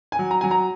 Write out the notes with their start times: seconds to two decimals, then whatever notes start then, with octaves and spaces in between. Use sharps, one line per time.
0.12 G#5
0.19 F#3
0.31 A#5
0.41 F#3 G#5
0.51 A#5